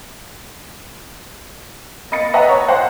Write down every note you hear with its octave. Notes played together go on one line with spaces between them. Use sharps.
D#5 B5 A6 C#7
B4 D#5 E5 F#5 A#5
C#5
C5 F#5 C6